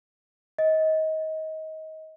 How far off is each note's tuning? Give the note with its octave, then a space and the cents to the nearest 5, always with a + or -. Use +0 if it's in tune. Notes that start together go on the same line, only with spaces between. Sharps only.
D#5 +25